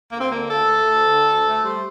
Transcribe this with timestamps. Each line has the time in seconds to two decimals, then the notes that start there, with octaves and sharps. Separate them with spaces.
0.11 D2 A#3
0.20 C4
0.29 D3 A#3
0.49 D2 A4
0.69 A3
0.87 D2
1.07 D3
1.27 D2
1.45 A3
1.64 G3 C5